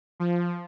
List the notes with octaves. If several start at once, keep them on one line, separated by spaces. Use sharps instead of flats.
F3